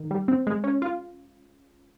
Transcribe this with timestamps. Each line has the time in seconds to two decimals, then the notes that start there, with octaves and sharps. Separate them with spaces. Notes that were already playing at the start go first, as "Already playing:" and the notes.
Already playing: D#3
0.11 G3
0.28 C4
0.47 G#3
0.64 C#4
0.82 F4